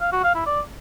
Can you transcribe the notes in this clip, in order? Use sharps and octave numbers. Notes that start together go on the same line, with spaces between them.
F5
F#4
F5
E4
D5